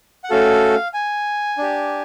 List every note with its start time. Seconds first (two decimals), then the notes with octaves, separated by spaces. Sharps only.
0.24 F#5
0.30 A3 C#4 F#4 A4 F5
0.94 G#5
1.58 D4 G4